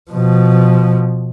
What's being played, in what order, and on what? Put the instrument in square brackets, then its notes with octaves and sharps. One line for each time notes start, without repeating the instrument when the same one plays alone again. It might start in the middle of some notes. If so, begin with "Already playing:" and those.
[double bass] B2 F3